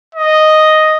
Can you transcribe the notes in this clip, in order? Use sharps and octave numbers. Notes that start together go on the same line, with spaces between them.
D#5